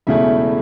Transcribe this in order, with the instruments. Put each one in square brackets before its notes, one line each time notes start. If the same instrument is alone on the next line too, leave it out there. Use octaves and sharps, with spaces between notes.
[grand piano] E1 E2 C#3 A3 E4 E5